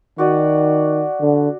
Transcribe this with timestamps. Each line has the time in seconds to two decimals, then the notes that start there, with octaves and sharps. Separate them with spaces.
0.18 D#3 F#4 D5 G#5
1.22 D3